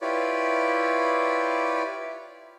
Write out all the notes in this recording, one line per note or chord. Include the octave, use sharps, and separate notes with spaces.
E4 F4 G4 B4 C#5 D5